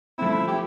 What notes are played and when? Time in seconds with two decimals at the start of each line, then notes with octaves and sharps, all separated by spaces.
0.18 F3 A3 C4 E4
0.48 G4